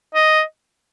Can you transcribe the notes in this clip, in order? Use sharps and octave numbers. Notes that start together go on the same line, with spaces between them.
D#5